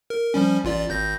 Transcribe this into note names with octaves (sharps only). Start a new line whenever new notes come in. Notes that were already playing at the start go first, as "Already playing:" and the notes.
A#4
F3 G3 C#4
A1 F4 D5
G#1 G6 A#6